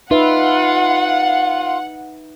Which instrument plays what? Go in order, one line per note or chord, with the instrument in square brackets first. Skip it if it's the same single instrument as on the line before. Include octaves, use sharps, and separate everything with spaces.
[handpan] D#4 B4 E5 [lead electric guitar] F4 [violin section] F#5